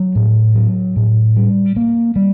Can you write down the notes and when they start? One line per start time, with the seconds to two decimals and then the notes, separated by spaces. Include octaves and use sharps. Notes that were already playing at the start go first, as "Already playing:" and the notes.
Already playing: F#3
0.16 A2
0.55 F#3
0.96 A2
1.36 G3
1.76 A#3
2.16 G3